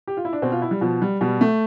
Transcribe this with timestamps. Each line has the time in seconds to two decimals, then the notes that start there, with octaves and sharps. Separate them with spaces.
0.07 G4
0.17 F4
0.25 E4
0.33 D4
0.42 B2 C4
0.52 F4
0.62 E4
0.71 G3
0.81 B2 F3
1.02 G3
1.21 B2 G3
1.41 A3